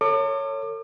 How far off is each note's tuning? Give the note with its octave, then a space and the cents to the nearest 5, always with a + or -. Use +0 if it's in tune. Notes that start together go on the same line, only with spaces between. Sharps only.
A4 +45 C#5 +0 D6 +40